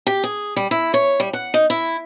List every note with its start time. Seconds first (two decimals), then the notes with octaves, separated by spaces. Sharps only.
0.07 G4
0.24 G#4
0.56 G3
0.71 E4
0.94 C#5
1.20 G3
1.33 F#5
1.54 D#4
1.70 E4